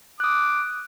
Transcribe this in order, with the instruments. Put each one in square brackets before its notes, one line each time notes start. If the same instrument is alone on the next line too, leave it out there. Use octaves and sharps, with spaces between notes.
[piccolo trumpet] D6 [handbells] D#6 F#6